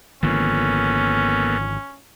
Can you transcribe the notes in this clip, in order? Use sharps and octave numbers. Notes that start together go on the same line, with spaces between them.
G#1 D3 F3 A#3 B3 C#4 A4